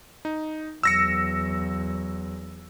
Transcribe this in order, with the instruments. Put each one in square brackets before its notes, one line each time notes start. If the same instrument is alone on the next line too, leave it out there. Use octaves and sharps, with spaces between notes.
[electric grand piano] D#4
[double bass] E2 F#3 [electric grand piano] E6 A#6 C#7